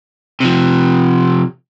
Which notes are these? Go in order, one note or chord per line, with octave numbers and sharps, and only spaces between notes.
C3 F3